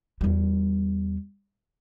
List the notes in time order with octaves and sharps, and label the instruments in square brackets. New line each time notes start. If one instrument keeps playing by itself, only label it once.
[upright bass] E2 G3